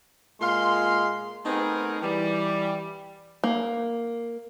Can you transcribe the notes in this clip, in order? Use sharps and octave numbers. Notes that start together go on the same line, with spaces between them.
A#2 G#3 F5 C6
A3 B3 C4 D#4 G#4 A#4
E3 G3
A#3